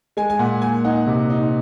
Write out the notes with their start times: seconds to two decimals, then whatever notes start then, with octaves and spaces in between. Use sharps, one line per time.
0.17 G#3 G#5
0.30 G#5
0.39 A#2 F#5
0.62 A#2 G#5
0.85 D#4 F#5
1.07 C3
1.30 D#4